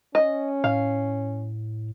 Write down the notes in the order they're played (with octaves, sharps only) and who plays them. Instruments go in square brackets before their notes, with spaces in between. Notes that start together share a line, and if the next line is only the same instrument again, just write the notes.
[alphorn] C#4 [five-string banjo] D#5
[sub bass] A2 [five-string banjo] F5